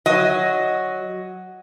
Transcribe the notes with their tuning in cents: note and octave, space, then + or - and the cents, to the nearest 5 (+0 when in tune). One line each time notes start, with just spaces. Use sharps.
F#3 +0 D#5 +0